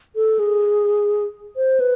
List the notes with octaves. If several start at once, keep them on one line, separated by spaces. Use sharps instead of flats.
A4
G#4
C5
B4